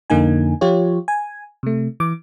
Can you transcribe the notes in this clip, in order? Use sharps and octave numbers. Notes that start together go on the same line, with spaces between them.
F2 D3 A#3 D#4 G#5
F3 F4 G4 C#5
G#5
C3 A3
E3 D6